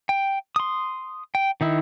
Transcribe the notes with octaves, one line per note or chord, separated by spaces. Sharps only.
G5
C6 D#6
G5
D#3 D#4 E4